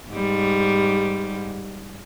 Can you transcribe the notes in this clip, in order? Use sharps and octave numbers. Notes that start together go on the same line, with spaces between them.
G#2 G3